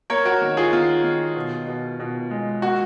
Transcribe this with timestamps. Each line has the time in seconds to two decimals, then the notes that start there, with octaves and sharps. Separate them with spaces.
0.10 A#3 A#4 C#5
0.25 F#4 A#4
0.42 D#3
0.57 F4 G#4
0.73 D#3 F4
1.04 D#3
1.36 B2
1.68 B2
2.00 B2
2.31 G#3
2.62 A#3 F#4